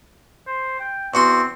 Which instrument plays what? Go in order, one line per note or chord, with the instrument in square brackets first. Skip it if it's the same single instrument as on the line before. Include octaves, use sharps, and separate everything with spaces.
[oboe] C5
G5
[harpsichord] E2 F#4 C6 [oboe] C4